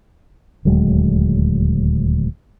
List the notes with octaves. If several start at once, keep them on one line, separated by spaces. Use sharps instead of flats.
D#1 D2 F#3 G#3